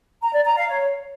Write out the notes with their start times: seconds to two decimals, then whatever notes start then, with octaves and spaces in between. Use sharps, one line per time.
0.21 A#5
0.33 D5
0.45 A#5
0.57 F5
0.68 C#5